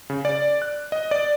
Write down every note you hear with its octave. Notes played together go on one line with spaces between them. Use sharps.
C#3
D5
F#6
D#5
D5